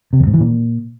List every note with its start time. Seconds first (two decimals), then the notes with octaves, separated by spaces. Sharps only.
0.13 C3
0.20 E2
0.27 G#2
0.33 E3
0.40 A#2